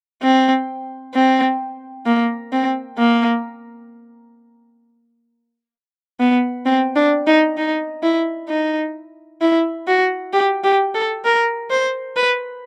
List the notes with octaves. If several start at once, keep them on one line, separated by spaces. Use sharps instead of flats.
C4
C4
A#3
C4
A#3
B3
C4
D4
D#4
D#4
E4
D#4
E4
F#4
G4
G4
A4
A#4
C5
B4